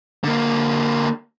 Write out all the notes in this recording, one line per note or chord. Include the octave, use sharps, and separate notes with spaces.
D3 A#3